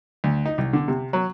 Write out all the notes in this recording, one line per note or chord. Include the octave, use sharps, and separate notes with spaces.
D2
D#4
C2
D3
C3
F#3